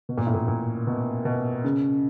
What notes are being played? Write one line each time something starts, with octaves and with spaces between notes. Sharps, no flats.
B2
A#2
A2
A#2
A#2
B2
B2
C#3